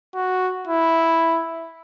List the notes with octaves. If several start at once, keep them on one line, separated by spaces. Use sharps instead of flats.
F#4
E4